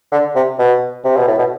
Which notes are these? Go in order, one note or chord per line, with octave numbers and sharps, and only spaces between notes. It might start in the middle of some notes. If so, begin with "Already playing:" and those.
D3
C3
B2
C3
B2
A2
B2